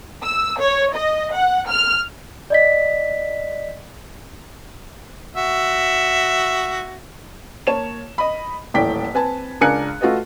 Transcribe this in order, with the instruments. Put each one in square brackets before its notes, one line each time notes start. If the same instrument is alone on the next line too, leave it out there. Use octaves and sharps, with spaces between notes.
[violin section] E6
C#5
D#5
F#5
F6
[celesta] D5 D#5 B6
[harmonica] F#4 E5
[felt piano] A#3 C#5 A5 E7
D#5 B5
D#1 A1 A2 D5 G5 B6
C4 B4 G#5 A5
C#2 D4 A#4 G#5 F#6 C#7
A3 F4 F#4 A4 B4 D#5